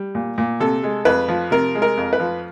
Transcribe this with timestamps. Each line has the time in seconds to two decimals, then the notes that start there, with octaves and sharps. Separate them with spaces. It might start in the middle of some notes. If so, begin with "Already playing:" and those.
Already playing: G3
0.15 A#2
0.38 A#2
0.60 C3 A4
0.83 G#3
1.05 F2 B4
1.28 F3
1.51 C3 A#4
1.75 G#3
1.82 A#4
1.97 F2
2.13 B4
2.20 F3